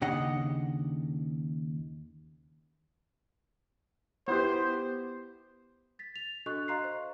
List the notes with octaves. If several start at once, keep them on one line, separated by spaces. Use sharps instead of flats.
D#2 C#3 D4 D#5 F#5
B3 E4 G4 C5
A6 B6
F7
D4 F#4 A4 D#5 C#6 F#6
D#5 F5 A#5 C6 F#6 C7
C5